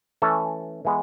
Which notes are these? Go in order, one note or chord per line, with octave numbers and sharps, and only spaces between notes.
E3 A3 C#4 A4
E3 G#3 B3